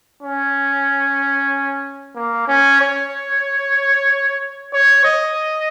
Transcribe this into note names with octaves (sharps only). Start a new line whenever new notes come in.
C#4
A#3
C#4
C#5
C#5
D#5